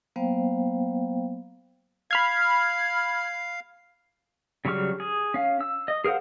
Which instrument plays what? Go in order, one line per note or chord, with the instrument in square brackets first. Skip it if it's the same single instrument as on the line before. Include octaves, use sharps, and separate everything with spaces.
[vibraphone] F#3 A#3 B3 C5 F5 G5
[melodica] F5 [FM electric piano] B5 F6 G#6
[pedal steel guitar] C#3 F#3 G3 C#6 F6
G#4
C#4 F5
E6
D#5
G#4 A#4 C5 F5 F#5